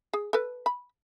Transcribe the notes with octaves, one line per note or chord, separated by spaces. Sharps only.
G#4
A4 B4
B5